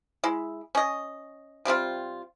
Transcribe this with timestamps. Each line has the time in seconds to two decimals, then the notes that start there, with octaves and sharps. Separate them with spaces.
0.24 G#3 E4
0.75 C#4 D#5
1.65 C3 G3 C4 F4